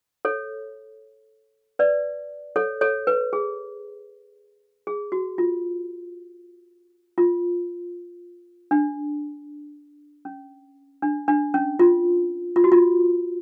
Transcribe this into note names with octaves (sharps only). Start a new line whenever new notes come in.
A4 C#5
B4 D5
A4 C#5
A4 C#5
B4
G#4
G#4
F#4
F4
F4
D4
C#4
D4
D4
C#4
F4
F4
F#4
F4